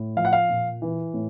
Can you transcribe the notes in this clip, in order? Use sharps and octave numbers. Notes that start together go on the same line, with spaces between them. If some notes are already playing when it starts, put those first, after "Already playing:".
Already playing: A2
F3 F5
F#5
F5
A#2
E3
A2